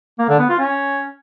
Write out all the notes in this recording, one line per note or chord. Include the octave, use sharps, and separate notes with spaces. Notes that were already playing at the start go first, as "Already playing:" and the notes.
A#3
D3
B3
F4
C#4